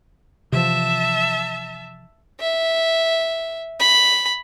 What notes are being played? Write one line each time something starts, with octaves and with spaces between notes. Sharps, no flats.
C3 E3 F3 E5 A5
E5
B5